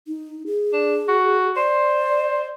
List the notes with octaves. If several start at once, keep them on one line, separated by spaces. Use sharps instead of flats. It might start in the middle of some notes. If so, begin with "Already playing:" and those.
D#4
G#4
D4
F#4
C5 D5